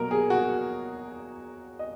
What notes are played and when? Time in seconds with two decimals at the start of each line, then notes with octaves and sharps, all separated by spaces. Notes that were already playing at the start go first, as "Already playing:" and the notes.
Already playing: B2 F#3 A#3 A#4
0.11 G#4
0.30 F#4
1.79 D#5